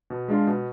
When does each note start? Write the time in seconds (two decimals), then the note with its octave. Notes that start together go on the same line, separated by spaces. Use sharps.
0.10 B2
0.28 G#3 D4 F4
0.47 B2